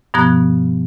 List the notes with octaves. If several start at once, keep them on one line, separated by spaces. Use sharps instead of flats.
G2 B2 F3 B3 A#5 F#6